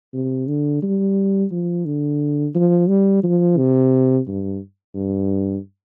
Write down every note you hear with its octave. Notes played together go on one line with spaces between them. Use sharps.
C3
D3
G3
F3
D3
F3
G3
F3
C3
G2
G2